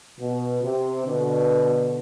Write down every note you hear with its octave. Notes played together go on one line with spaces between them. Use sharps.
B2
C3
B2 D3